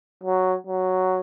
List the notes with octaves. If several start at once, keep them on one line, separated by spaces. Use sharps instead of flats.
F#3
F#3